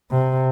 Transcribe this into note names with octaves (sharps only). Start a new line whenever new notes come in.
C3